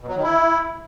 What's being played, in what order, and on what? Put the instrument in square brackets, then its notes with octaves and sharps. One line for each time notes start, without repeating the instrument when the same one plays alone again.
[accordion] B2
F#3
D#3
E4